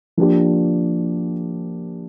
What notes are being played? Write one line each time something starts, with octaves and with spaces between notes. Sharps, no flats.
F3 A#3 D4 G4